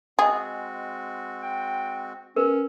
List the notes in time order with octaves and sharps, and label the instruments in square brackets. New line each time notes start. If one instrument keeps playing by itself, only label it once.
[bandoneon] G#3 C4 F#4 [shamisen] G#4 [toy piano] D#5 F#5
[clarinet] G5
[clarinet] C#4 [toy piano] A#4 B4